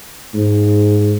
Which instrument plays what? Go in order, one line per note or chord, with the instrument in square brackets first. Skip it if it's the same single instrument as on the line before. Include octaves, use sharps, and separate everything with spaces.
[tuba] G#2